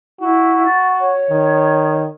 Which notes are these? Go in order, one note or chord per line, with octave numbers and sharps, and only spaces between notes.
E4 F#4
A6
C#5
D#3